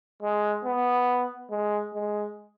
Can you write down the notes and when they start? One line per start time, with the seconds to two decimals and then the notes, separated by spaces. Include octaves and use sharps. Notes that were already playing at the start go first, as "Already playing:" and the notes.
0.22 G#3
0.65 B3
1.50 G#3
1.94 G#3